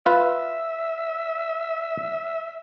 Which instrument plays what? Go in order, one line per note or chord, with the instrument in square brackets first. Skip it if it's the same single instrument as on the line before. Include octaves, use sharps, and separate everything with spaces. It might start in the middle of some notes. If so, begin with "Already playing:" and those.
[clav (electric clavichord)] F4 B4 [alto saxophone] E5